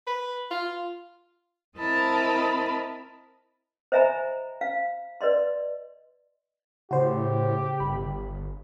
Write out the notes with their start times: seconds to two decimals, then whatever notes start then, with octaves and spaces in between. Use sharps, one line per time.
0.07 B4
0.51 F4
1.77 C4 E4 A#4 D#5 A5 B5
3.92 C5 D#5 E5 G#5 A#5 B5
4.61 F5
5.21 B4 D5 D#5 C6
6.91 A2 C#3 F#4 G4 C5
7.80 G1 B5